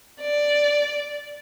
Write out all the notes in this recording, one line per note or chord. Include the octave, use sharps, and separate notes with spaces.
D5